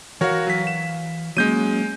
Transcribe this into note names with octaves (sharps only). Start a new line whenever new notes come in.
E3 F#4 A#4 C#5 F5
F#3 B6
E7
F#3 G#3 A#3 C#4 G6 D#7